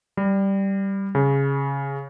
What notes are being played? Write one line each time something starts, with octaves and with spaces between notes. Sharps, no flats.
G3
C#3